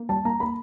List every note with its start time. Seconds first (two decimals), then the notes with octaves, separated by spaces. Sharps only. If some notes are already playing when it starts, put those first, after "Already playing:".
Already playing: A#3
0.09 G3 A5
0.25 A#3 A#5
0.40 A#3 B5